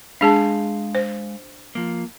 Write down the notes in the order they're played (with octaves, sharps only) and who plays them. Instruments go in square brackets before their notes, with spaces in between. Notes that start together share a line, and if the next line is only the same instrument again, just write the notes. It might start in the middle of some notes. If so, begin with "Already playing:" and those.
[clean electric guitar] G#3 F5 [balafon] D4 G#4 A5
[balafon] C5
[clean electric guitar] F3 A#3